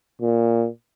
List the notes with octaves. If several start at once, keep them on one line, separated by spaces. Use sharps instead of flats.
A#2